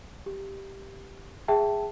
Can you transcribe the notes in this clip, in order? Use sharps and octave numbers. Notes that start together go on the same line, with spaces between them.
G4
G#4 E5 G5 A5